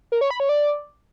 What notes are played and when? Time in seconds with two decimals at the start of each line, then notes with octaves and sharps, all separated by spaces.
0.12 A#4
0.21 C#5
0.31 B5
0.40 C#5
0.49 D5